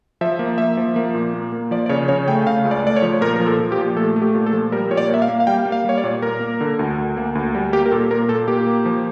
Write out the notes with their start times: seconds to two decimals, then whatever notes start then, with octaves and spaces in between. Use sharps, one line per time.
0.21 F3 E5
0.39 A#3
0.58 A#3 E5
0.77 F3
0.96 A#3
1.14 A#2
1.34 A#3
1.52 A#3
1.71 F3 D5
1.86 D5
1.89 C#3 C#5
2.08 C#3 C#5
2.28 A3 G5
2.46 C#3 F5
2.65 C#2
2.71 D5
2.84 A3 D5
2.96 C#5
3.02 F3
3.21 A#2 A#4
3.36 F3 A#4
3.46 A4
3.60 F3
3.72 G4
3.78 A#2
3.96 A3 A4
4.16 A3
4.22 G4
4.35 A#2
4.46 A4
4.53 F3
4.72 G3 A#4
4.91 A#2 C#5
4.97 D5
5.09 A#3 E5
5.22 F5
5.29 A#3
5.40 F5
5.47 G3 G5
5.65 A#3
5.72 F5
5.85 G3 C#5
5.98 D5
6.04 A#2
6.22 A#3 A#4
6.41 A#3
6.61 D3
6.79 D2
6.98 D2
7.17 A#3
7.35 D2
7.55 G3
7.73 A#3 G4
7.86 A#4
7.91 A#2 A4
8.11 A#3 A#4
8.29 A#2 A4
8.48 A#3 G4
8.67 A#3
8.86 F3